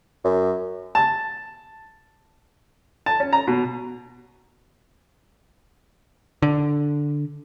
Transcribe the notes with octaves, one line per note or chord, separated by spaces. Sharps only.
F#2
A5
A5
C#4
A#5
B2
D3